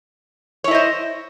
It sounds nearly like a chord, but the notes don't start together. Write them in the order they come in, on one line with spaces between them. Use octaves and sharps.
C#5 E4 D#5 C5